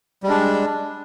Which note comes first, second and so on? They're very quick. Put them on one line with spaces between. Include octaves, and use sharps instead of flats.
G3 G#3 D4